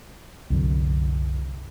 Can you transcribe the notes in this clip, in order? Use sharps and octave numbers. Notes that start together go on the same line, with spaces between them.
C2 F#2 D3